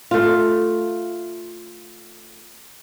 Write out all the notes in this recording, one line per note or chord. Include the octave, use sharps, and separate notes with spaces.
A3 F4